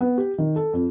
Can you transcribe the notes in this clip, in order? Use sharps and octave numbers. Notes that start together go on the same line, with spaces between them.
B3
G4
D#3
A4
F2